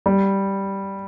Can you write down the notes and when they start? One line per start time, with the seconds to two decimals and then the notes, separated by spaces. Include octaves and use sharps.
0.06 G3